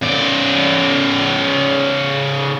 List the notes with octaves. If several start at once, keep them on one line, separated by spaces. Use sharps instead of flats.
C#3 D5